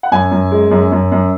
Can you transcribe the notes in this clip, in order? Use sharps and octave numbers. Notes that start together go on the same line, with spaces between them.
F#5
F#2 G#5
F#2
G#3
F#2
F#2
F#2